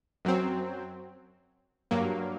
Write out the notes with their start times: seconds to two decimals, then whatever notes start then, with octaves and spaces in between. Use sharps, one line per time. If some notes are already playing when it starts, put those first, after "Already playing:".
0.25 F#2 F#3 C4
1.91 G2 F#3 A#3